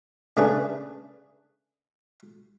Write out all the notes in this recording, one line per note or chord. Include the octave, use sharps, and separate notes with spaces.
C#3 A3 D4 G#4 B4